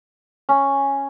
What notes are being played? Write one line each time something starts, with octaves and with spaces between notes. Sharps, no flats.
C#4